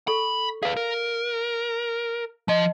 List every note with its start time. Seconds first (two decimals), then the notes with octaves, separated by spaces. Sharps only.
0.08 A4 B5 C#6
0.63 G#4 B4 F5
0.77 A#4
2.48 F3 D#5 A5 C6